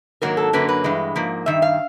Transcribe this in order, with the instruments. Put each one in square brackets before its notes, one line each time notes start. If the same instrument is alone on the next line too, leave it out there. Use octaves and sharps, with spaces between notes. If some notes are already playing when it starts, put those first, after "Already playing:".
[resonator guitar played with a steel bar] G#2 D#3 F#3 A#3 A#4
A4
F#2 D3 F#3 A#3 B4
B4
G2 E3 G#3
G#2 F3 A#3
G2 D#3 E5
F5